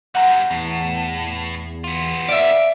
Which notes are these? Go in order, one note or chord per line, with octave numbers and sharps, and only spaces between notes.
F#2 G3 F#5 A#5
E2 A2
B3 F4
D5 E5 F5